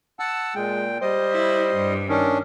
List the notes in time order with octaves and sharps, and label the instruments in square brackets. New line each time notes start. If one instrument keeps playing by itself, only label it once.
[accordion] F#5 A5 E6
[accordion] A#2 G5 [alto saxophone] G#3
[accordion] G3 D#5 [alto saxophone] C5
[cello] E4
G2
[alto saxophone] D#3 [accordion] C#4 D4